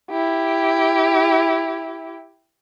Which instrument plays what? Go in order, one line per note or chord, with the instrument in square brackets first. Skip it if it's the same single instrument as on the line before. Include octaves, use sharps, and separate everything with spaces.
[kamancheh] E4 G4